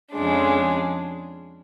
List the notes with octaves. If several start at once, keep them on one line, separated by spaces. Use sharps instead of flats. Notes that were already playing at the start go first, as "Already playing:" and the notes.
F2 C#3 G#3 D4